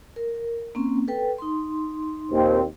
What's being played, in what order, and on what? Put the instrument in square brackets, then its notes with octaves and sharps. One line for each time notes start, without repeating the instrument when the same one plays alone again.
[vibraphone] A#4
A#3 C4 C#4
A4 B4 G5
D#4 C6
[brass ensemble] D#2 A#2 C4